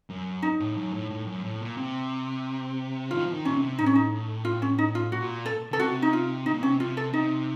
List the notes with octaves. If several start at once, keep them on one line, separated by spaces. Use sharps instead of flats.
F#2
D#4
A2
F#2
A2
A2
F#2
A2
A#2
C3
D#3 F4
F3
D#3
A#2 C#4
C3
A2 D#4
C#4
D#4
F4
C#4
D#4
F4
A#2 F#4
A4
C#3 A4
C3 F#4
D#4
F4
C3 D#4
A#2
C3 C#4
C3 F4
A4
C3 D#4